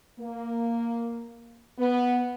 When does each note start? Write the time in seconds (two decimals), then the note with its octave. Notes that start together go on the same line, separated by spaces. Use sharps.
0.19 A#3
1.78 B3